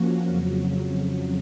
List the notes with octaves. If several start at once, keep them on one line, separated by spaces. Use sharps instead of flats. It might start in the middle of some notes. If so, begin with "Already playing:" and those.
Already playing: F3 A#3 C#4 F#4
F2 C#3 F#3